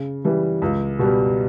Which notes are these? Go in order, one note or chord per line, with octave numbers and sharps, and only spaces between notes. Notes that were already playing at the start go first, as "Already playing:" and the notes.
Already playing: C#3
E3 G3
C#2
B2 G3 B3